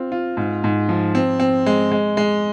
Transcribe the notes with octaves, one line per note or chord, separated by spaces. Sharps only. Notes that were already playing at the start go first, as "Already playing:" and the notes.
Already playing: C4 F4
F4
G#2
G#2
F3
C4
C4
G#3
G#3
G#3